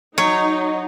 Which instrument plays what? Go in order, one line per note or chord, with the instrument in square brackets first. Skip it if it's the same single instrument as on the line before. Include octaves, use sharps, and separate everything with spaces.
[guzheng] F#3 [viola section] D#4 [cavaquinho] C#5